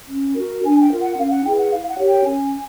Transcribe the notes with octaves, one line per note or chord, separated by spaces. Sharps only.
C#4
F#4 A#4
D4 G#5
G5
F4 A#4
F#5
C#4 F5
F#5
E4 G#4 B4 G5
F#5
E4 F5
F#5
G4 A#4 C#5
G5
C#4 G#5